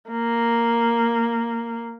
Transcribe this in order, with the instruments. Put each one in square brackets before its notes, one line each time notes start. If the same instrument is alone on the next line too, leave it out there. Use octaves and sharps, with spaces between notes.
[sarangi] A#3